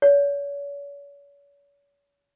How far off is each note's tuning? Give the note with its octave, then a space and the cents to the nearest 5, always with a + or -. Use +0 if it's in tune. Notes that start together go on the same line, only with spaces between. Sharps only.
C#5 +40